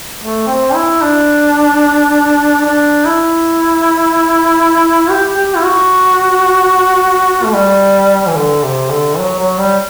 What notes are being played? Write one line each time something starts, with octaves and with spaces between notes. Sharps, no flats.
A3
C4
E4
D4
D4
E4
G4
G4
E4
F#4
A3
G3
E3
D3
C3
D3
F#3
F#3
G3